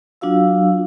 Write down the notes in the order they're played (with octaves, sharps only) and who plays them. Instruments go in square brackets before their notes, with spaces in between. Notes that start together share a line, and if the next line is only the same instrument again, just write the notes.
[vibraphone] F#3 D4 F4 F#4 F5 E6